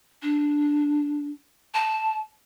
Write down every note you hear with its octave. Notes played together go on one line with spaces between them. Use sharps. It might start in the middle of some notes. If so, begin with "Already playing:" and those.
D4
A5